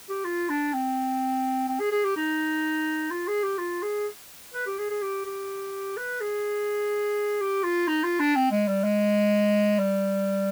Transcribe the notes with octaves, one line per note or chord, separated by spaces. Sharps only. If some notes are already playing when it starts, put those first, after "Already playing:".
G4
F4
D4
C4
C4
G#4
G#4
G4
D#4
F4
G#4
G4
F4
G#4
B4
G4
G#4
G#4
G4
G4
B4
G#4
G4
F4
D#4
F4
D4
C4
G#3
G3
G#3
G3